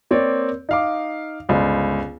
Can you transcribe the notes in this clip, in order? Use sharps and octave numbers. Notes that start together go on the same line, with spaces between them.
A#3 C4 C#5 D5
D#4 F5 D6
G1 C#2 C5